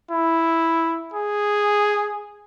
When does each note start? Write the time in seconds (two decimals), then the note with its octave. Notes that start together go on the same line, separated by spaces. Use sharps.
0.11 E4
1.14 G#4